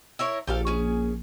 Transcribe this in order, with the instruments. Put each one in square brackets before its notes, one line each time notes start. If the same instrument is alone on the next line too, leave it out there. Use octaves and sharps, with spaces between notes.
[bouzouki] E4 A#4 C#5
[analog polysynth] A#1 [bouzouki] G4 A4 F5
[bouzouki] C#4 G#4